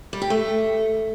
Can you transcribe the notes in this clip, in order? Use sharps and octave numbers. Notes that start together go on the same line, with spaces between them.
G3
G4
A3